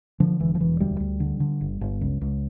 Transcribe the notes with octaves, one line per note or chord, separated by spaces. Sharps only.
D3 F3
E1 E3
F3
E1 E3
D2 G3
D2
D3
D3
G1
G1
C#2
C#2